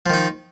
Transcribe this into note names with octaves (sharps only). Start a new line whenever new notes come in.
D#3 F3 D#4